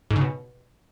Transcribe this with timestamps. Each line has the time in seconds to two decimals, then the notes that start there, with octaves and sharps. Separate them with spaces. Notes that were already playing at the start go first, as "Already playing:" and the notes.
0.11 G#2
0.16 C#3
0.21 B2